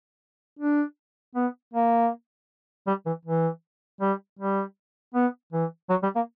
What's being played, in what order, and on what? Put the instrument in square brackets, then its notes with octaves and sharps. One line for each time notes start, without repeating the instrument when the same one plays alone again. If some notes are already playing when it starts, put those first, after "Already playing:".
[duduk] D4
B3
A#3
G3
E3
E3
G3
G3
B3
E3
F#3
G3
A#3